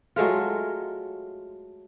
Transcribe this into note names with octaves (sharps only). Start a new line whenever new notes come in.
F#3 G#3 A3 F4